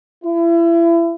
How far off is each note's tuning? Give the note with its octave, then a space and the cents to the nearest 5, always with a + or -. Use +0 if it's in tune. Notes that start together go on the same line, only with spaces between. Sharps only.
E4 +35